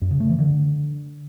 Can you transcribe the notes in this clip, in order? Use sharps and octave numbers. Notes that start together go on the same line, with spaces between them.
F#2
C#3
A3
E3
D3